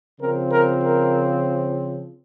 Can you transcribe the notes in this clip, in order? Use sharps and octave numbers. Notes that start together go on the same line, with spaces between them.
C#3 F3 C4 A#4
A#4
A#4